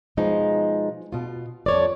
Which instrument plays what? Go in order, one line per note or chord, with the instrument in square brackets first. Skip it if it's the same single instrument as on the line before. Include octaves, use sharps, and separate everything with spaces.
[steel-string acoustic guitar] B2 F3 G#3 D#4
B2 F4
F2 C#5 D5